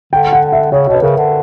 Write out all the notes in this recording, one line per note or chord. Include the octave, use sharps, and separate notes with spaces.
D3 G5
F#5
E5
C#3 C#5
B2 C#5
B4
C#3 A#4
D3